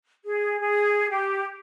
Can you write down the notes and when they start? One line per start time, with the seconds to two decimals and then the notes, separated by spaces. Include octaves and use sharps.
0.24 G#4
0.60 G#4
1.10 G4